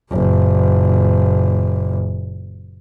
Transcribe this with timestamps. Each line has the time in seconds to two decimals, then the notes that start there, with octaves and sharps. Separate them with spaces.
0.10 F#1 A#2